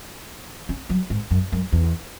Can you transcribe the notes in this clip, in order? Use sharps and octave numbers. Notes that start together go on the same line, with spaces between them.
C#4
F#3
G#2
F#2
F#2
E2